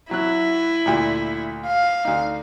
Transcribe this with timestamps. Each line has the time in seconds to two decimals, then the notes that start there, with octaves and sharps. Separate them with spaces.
0.11 F#3 E4 F#6
0.86 D2 A#2
1.67 F5
2.05 D2 D#4